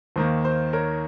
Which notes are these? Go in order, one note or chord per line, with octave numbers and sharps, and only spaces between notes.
D#2 D#3 A#3 C5
C5
A#4 C#5